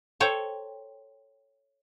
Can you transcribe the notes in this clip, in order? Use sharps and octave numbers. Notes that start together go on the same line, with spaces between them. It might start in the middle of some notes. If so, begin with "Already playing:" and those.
A4 C5 C#5 G5